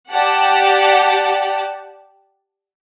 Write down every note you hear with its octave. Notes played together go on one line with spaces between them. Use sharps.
G4 D5 F#5 A5